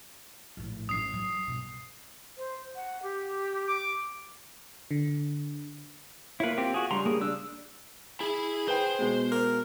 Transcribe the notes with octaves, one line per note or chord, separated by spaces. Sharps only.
A#1 A2
A1 F#2 D#6 C7
F#2 F#3
G2 B2
C5
F#5
G4
D6
D3
A#3 E4 F4 B4 C#5
C4 G4
F#4 G#4
C#2 G3 D4 A#5 C6
A#3 G#4
D4 E6
E4 G#4 B5
B4 C5 G5
B2 G#3 B3
A#4